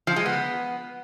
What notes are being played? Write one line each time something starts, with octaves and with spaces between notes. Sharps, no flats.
F3
G#3
B3